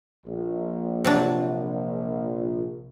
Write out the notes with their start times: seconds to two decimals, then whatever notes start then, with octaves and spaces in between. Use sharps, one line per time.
0.26 A#1
1.04 C3 F#3 D4